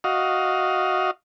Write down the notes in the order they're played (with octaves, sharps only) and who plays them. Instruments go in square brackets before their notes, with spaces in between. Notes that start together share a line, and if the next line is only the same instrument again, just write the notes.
[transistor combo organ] F#4 D#5 F5